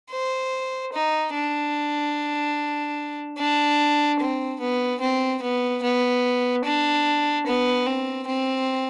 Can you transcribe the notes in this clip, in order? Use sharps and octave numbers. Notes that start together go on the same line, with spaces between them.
C5
D#4
D4
D4
C4
B3
C4
B3
B3
D4
B3
C4
C4